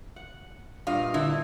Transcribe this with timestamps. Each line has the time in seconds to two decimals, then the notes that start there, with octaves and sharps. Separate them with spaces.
0.16 F#5
0.87 G2 A#2 D#5 F5
1.14 D3 E4